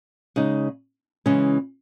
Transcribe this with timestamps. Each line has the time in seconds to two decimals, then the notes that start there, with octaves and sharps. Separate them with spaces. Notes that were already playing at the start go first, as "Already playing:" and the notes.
0.36 C#3 G#3 D#4
1.26 C#3 E3 G#3 C#4